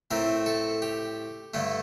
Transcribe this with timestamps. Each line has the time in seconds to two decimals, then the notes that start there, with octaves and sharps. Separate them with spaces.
0.11 A2 A3 C4 A#4
0.46 A4
0.82 G4
1.54 G2 D3 A3